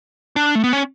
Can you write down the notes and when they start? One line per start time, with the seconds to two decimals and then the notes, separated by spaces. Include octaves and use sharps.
0.36 D4
0.55 A3
0.64 B3
0.73 C#4